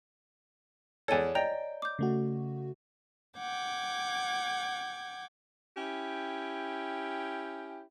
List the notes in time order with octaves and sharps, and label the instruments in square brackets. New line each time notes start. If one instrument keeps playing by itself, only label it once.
[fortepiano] E2 A4 [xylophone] C#5 D5 G#5
[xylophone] D5 D#5 A#5 [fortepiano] G5
[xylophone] D6 G6
[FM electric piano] C#3 A3 F#4
[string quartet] F#5 G5 D6 G#6
[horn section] C#4 E4 G4 G5